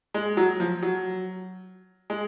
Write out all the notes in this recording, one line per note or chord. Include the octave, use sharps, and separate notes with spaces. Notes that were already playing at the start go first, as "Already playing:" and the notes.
G#3
F#3
F3
F#3
G#3